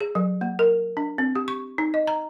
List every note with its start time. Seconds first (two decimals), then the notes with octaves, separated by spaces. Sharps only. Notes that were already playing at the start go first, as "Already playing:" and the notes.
0.01 G#4
0.15 F#3
0.41 A#3
0.59 A#4
0.97 D4
1.18 C4
1.35 G4
1.48 C#6
1.78 D#4
1.94 D#5
2.07 A#5